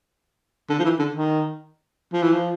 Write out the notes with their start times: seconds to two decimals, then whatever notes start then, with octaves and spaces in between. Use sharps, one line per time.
0.69 D3
0.79 F3
0.84 E3
0.99 D3
1.14 D#3
2.13 F3
2.22 E3
2.33 F3